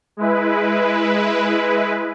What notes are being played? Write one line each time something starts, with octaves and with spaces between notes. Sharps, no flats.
G#3 E4 B4